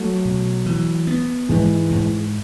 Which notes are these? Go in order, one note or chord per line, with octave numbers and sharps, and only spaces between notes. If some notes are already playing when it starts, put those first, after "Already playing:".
Already playing: F#3 A3
B2
E3
B3
G#2 E3 G#3
G#2